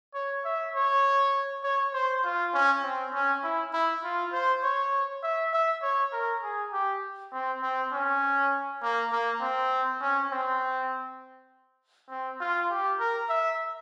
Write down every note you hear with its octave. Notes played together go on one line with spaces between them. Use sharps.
C#5
E5
C#5
C#5
C5
F4
C#4
C4
C#4
E4
E4
F4
C5
C#5
E5
E5
C#5
A#4
G#4
G4
C4
C4
C#4
A#3
A#3
C4
C#4
C4
C4
F4
G4
A#4
E5